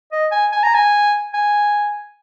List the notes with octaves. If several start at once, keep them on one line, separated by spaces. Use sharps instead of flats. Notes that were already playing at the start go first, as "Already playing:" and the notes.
D#5
G#5
G#5
A#5
G#5
G#5